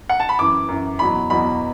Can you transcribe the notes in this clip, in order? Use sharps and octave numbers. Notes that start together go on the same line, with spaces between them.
F#5
A5
B5
F#2 E3 D6
F#2 E3
E2 B2 F#3 B5
E2 B2 F#3 B5